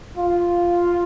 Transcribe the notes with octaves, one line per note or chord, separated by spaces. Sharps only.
F4